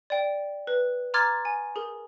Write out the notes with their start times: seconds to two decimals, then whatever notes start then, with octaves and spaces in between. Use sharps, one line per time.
0.10 D5 G5
0.67 B4
1.14 A#5 C6 D6 F6 G#6 A6
1.45 G#5
1.76 G#4 A#4